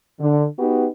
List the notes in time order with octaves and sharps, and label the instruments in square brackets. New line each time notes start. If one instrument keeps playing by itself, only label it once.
[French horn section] D3
B3 D#4 F#4 G4 B4